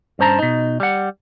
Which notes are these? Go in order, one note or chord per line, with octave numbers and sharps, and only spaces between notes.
G2 C#4 C5 A5 A#5
B2 D#4
G3 F#5